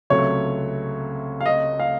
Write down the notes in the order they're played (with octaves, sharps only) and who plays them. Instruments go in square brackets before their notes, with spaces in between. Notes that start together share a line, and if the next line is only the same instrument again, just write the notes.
[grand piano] C#2 C3 F#3 A3 [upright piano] C#5
[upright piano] F5
D#5
F5